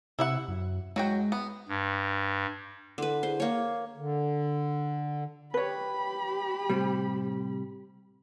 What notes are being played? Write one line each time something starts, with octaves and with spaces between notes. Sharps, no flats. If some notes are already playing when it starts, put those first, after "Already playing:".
C3 E4 E5 F#5
F#2
F#3 G#3 F#4 G5
B3
G2
D3 E4 A4 B4 C6
E4 G#4 C5
A#3 C#5 F5
D3
G4 B4 C#5 B5
A2 C3 G3